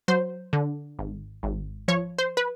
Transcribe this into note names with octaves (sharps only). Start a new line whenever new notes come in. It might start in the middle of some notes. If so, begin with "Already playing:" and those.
F#3 C5
D3
G#1
G#1
F3 C#5
C5
B4